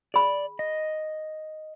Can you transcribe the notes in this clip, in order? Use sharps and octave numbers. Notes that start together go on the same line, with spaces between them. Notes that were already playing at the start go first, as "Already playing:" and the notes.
G#4 D5 B5
D#5